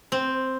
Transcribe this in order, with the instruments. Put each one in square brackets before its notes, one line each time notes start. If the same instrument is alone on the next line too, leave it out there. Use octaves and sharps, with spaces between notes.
[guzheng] C4